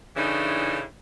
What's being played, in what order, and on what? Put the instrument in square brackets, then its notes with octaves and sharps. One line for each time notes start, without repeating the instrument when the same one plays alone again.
[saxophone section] A2 C#3 E3 D4 D#4